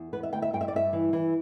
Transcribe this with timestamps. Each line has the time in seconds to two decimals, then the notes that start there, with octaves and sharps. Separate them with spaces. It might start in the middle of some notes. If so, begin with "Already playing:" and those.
Already playing: E2
0.13 B3 B4
0.23 E5
0.33 D2 G5
0.42 E5
0.53 G2 G5
0.61 E5
0.68 D5
0.73 G2 E5
0.93 E3
1.13 E3